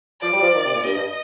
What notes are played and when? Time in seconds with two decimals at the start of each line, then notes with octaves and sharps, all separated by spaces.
0.21 F3 D5
0.32 G3
0.42 F3
0.53 D#3
0.64 C3
0.74 A#2
0.84 G2 D#5
0.95 G2